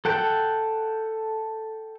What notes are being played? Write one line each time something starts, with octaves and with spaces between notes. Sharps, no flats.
A4 F#5 G5 A5